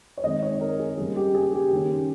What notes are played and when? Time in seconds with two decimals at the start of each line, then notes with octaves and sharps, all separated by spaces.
0.17 C#5
0.24 D#3 G#3 C4 D#5
0.43 C#5
0.61 A#4
0.79 G#4
0.98 C#3 G3 A#3 G#4
1.16 G4
1.35 G#4
1.53 G4
1.71 D#3 A#3 C#4 G4